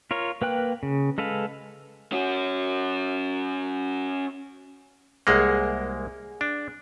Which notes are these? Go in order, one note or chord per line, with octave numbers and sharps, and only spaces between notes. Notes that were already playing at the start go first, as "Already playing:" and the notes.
F4 A#4 C#5
A#3 B4 G5 F#6
C#3
G#3 A4 B4 F5
C#4 F#4
C2 G#3 A#3 G#4 A#4 F#5
D4